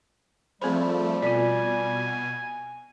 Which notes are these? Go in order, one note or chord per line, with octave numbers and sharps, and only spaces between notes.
F3 G3 A3 C4 G#4 B5
B2 F4 D5 G#5